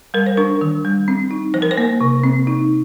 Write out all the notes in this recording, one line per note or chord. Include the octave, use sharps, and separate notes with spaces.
G3 A#4
C5
D4 A#4
D#3
G3
C4
D#4
F3 C5
A#4
C5
A#3
C3
C4
D#4